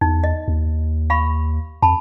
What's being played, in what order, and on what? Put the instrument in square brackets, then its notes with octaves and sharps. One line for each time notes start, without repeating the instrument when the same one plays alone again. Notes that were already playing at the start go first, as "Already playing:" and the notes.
[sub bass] E2 [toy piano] D#4
[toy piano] D#5
[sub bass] D#2
[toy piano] F5 B5 C#6
[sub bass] F2 [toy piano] A5 B5